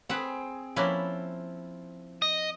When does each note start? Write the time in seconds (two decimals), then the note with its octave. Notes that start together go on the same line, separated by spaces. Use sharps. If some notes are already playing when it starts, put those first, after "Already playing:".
0.09 C4 G#4 B4 F#5
0.76 F3 A#3 C#4 E4 F4 B4
2.22 D#5